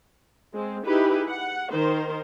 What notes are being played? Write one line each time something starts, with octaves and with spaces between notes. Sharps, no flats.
G#3 C4
D#4 E4 G4 G#4 B4
F#5
D#3 A#4 C5